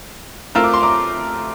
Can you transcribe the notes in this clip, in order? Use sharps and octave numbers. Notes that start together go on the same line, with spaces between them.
A3 C4 F4 A#4 E6
D6
C6
A#5 D6